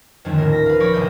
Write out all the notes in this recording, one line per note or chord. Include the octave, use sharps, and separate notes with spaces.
F2 D3 D#3 A3 C#4
D#1 A2 A#4
A#6 B6
B4 F5
F3 C#5 D5 B5 C#6 A#6
G1 C2 E5 F5 D#6 G6